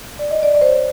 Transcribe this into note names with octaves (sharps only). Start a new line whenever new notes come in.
D5
D#5
D5
D5
C5
C#5